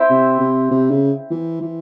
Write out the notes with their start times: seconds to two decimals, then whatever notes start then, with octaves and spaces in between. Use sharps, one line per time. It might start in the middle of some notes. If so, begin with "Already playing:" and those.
Already playing: C4 E4 C5
0.10 C3
0.40 C3
0.71 C3
0.91 C#3
1.31 E3
1.61 E3